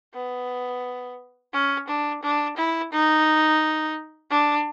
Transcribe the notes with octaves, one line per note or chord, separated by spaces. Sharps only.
B3
C#4
D4
D4
E4
D#4
D4